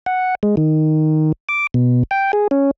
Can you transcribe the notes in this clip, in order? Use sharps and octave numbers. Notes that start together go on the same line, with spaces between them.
F#5
G#3
D#3
D6
B2
G5
G#4
C#4